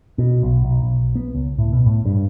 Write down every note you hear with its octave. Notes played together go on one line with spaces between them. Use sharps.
B2
B1
B1
B1
B3
C#2
A2
B2
A2
G2